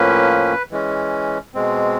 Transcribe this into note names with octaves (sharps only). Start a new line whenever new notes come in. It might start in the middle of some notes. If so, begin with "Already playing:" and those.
Already playing: A2 F3 A#3 C#4 B4
E3 G#3 C#4
B2 G#3 C4